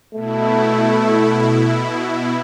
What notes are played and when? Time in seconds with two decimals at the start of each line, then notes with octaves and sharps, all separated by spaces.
0.15 B2 A3 E4